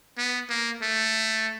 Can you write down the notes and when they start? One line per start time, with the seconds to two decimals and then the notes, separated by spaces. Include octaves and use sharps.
0.18 B3
0.49 A#3
0.82 A3